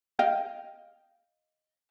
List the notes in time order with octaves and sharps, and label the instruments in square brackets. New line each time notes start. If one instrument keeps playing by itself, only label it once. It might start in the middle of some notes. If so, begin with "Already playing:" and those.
[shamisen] D#5 F5 G5